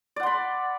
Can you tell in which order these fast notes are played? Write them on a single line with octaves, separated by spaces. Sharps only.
D5 F#5 C6 B5